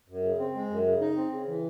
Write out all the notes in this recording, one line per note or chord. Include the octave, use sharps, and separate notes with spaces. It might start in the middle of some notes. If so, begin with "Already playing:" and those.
F#2
C#3
C4
G#3
F#2
C#3
D#4
C4
C#3
E3